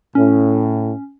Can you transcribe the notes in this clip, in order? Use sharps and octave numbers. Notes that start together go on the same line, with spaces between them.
A2 C#4